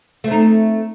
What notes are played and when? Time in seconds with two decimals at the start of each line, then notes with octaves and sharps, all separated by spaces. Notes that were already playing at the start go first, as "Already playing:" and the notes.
0.24 A3
0.28 C4
0.31 D#4